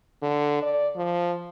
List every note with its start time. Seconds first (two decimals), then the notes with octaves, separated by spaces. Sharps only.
0.22 D3
0.62 D5
0.96 F3